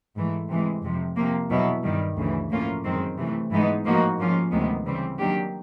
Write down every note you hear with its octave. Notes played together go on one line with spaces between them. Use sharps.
G#2 E3 A3
C3 E3 G#3
F2 C3 F3
C3 F3 A#3
E2 B2 F#3 B3 E4
G2 D#3 G3
D2 C#3 E3
A2 F3 A#3 C#4 F4
F#2 D#3 G#3 C4
C3 E3 A3
G#2 E3 G#3 B3 D#4
A2 F3 A#3 D#4 F#4
G#2 F3 A#3 C#4 F4
D2 C3 D#3 G#3 B3
C#3 E3 G3 C4
D#3 F#3 A#3 D4 G4